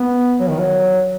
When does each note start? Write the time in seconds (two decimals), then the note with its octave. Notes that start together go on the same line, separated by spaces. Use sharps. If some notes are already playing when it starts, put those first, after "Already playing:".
Already playing: B3
0.40 F#3
0.49 D#3
0.59 F#3